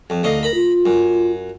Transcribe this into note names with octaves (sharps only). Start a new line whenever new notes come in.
F2
D2 D#4 A4 F5
A#4 A#5 B5
F4
F#2